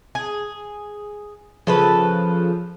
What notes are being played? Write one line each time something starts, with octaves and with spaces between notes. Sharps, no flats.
G#4
C#3 F3 A4 B4